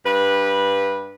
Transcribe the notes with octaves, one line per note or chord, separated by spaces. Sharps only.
G2 B4